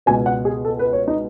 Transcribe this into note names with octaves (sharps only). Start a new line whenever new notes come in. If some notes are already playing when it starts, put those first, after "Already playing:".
C#2 B2 G#3 B3 G#5
F#5
G#4
A4
B4
C#5
D#4